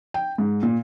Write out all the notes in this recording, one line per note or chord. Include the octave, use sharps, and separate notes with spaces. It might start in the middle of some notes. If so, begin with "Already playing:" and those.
G5
G#2
A#2